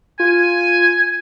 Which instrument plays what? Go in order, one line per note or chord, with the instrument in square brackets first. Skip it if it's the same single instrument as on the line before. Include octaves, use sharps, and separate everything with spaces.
[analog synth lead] F4 [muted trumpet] G#5